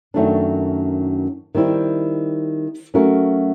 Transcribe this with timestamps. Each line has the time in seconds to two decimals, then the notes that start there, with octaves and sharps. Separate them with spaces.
0.14 F#2 D#3 F#3 A3 D4
1.54 D#3 G3 C4 E4
2.94 F#3 A3 C#4 F#4 A#4